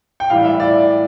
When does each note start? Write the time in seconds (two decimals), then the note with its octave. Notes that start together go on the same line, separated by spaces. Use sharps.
0.20 G5
0.30 A2 E3 G3 F5
0.45 E5
0.60 D5
0.74 D5